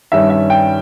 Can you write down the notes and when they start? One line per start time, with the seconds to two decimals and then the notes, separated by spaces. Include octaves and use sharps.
0.12 G2 D#3 G3 C#4 E5
0.30 E5
0.50 G5